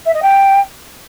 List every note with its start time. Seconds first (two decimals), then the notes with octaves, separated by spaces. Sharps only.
0.05 E5
0.14 D#5
0.22 G5